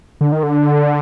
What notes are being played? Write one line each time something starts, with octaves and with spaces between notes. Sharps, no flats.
D3
D#3
D3